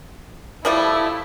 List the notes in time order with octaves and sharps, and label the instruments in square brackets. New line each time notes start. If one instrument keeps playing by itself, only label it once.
[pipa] F3 G3 A3 [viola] E4